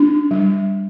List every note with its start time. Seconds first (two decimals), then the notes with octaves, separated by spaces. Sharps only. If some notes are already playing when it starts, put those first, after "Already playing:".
Already playing: D4
0.31 G3